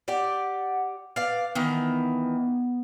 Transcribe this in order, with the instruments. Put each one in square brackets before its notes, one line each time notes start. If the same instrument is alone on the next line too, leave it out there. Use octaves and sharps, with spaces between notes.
[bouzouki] G4 D5 [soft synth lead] F#5
[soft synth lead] B4 [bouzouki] D5 F5
[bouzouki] D#3 E3 [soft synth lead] B3